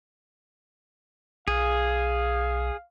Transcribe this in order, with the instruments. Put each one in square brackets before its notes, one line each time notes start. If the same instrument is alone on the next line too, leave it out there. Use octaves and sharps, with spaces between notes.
[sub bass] B1 [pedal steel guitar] G#4 [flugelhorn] F5